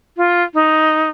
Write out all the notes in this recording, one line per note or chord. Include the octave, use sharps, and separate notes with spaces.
F4
D#4